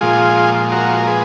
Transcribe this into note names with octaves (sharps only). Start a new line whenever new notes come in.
A#2 F3 G#3 F4 G#4
F#4 A#4
A#4
G#4 B4